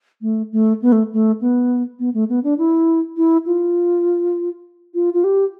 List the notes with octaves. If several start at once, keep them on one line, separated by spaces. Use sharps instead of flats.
A3
A3
B3
A3
A3
B3
B3
A3
B3
D4
E4
E4
F4
F4
F4
G4